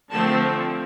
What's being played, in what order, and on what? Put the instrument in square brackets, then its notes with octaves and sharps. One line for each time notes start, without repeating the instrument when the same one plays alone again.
[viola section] D3 F3 A3 C4 A5